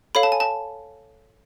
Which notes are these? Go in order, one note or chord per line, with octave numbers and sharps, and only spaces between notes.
A4 C#5 F5 B5
A5
G#5
A5